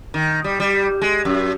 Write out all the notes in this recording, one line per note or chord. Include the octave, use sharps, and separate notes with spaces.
D#3
G3
G3
G#3
F#2